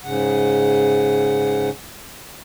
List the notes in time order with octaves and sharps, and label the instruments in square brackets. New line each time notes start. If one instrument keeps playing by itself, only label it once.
[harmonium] G#2 C#3 F#5